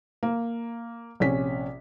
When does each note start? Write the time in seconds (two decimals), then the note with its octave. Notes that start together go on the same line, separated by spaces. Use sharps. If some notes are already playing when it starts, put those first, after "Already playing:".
0.23 A#3
1.20 A#1 C3 C#4 B6